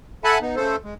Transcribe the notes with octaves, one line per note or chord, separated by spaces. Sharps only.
A4 E5 F#5 G#5 A5 B5
B3 D#4
C#3 A3 A4 C5
G#3